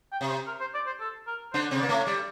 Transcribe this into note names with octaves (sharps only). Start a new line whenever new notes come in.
G5
C3
C5
A#4
C5
D5
C5
A4
A#4
D3 D4 C5
C3 C4
A#3 D5
A2 A3
G3 D5